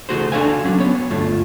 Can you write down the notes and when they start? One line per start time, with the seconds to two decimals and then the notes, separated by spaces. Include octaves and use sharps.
0.09 C#3 E3 A3 F#4 G#4 C5
0.32 D4 F#4 A4 F5 G#5
0.64 F#3 C#4 D4
0.78 B3 C#5
1.09 D2 G2 A3 F4